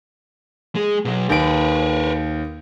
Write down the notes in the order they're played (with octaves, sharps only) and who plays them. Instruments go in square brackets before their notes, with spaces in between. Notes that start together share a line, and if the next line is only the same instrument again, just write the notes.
[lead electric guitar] G#3 G#4
B2 F#3
[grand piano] D#2 D7 [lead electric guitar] A#4 B4